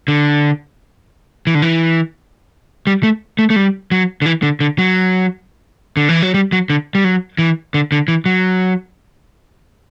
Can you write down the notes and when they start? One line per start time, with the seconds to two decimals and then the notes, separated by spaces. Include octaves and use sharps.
0.08 D3
1.47 E3
1.55 D3
1.62 E3
2.87 G3
3.03 A3
3.39 A3
3.50 A3
3.56 G3
3.91 F#3
4.22 D3
4.26 E3
4.43 D3
4.60 D3
4.78 F#3
5.97 D3
6.09 E3
6.22 F#3
6.34 G3
6.52 F#3
6.70 D3
6.95 G3
7.04 F#3
7.38 E3
7.74 D3
7.92 D3
8.08 E3
8.26 F#3